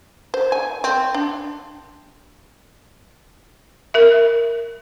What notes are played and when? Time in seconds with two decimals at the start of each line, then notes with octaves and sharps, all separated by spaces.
0.34 C5
0.52 G#5
0.84 C4
1.14 D4
3.94 A#4 E5